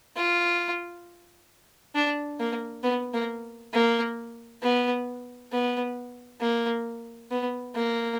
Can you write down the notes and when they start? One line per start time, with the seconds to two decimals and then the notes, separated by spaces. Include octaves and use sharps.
0.16 F4
1.95 D4
2.39 A#3
2.84 B3
3.14 A#3
3.74 A#3
4.63 B3
5.52 B3
6.41 A#3
7.31 B3
7.75 A#3